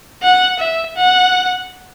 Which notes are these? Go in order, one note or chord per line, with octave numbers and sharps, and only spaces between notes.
F#5
E5
F#5